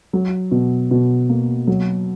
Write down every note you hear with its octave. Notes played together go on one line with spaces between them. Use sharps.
F#3
B2
B2
A#3
F#3